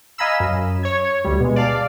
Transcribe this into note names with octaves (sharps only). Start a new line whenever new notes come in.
D#5 F5 G#5 A#5 B5 E6
F#2
C#5 G#6
D2 G3
B2 G#3
D5 F5 A5